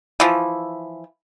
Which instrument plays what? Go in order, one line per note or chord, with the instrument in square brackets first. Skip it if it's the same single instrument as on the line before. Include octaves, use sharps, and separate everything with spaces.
[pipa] E3 F3